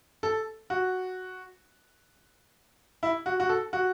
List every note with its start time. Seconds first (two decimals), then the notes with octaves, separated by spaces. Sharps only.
0.23 A4
0.70 F#4
3.03 E4
3.26 F#4
3.40 F#4
3.49 A4
3.73 F#4